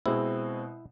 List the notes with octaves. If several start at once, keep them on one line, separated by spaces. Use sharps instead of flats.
B2 G#3 C4 E4